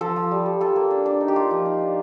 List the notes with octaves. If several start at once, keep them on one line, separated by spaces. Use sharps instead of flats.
F3 A4
F3
G3
G3
F4 A4
A#3
D4
D4
D#4
G4
A#3 F4
F3
D#4
D4